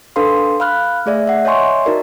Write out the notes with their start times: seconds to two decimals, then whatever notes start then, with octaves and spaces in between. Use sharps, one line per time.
0.16 D4 A4 B4 F5 C6
0.60 F5 B5 F6 F#6
1.06 A3 G#4 D5 E5
1.27 E5 F#5
1.45 C#5 D#5 E5 G#5 C6 C#6
1.85 D#4 F#4 A#4 D5 D#5